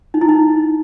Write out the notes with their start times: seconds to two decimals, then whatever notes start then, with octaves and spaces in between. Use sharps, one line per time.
0.14 D#4
0.21 E4
0.29 D#4